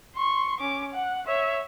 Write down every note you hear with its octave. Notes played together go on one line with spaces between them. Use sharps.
C6 C#6
C#4 D6
F#5
C#5 E5